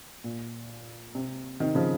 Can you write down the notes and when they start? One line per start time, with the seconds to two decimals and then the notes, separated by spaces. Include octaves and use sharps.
0.24 A#2
1.15 C3
1.60 C3 D#3
1.75 C#3 F3